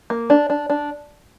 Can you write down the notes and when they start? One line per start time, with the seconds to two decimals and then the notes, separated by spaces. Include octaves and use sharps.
0.10 A#3
0.30 D4
0.50 D4
0.70 D4